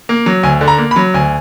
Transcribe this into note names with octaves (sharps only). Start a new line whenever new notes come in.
A#3
F#3
D2 G#5
D3
A#5
A#3
B5
F#3
D2 G#5